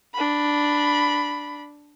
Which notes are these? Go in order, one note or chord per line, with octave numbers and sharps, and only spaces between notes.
D4 B5